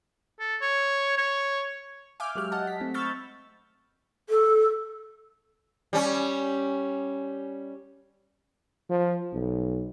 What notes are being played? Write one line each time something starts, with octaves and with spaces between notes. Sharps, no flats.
A4
C#5
C#5
E5 F5 G#5 D6 F6 G6
F#3 G#3 G4 F6
D#5 F#5 A5
B6
A3 C4
B5 C#6 E6 F6 G6 A6
A4
G3 C#4
F3
B1